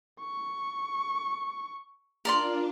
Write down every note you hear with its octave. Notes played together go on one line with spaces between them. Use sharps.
C#6
D4 F4 A#4 D5 C6